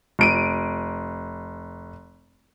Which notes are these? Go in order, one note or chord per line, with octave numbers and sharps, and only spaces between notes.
F1 D7 D#7